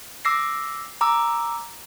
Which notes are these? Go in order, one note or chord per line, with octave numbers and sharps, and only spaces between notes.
D6 E6 A#6 C7
A#5 D6 E6